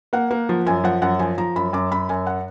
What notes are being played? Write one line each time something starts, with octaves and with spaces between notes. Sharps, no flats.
A#3 F#5
A#3
F3
F#2 G#5
F3 F#5
F#2 F#5
F3 G#5
F3 A#5
F#2 B5
F#2 D6
F#2 B5
F#2 G#5
F#5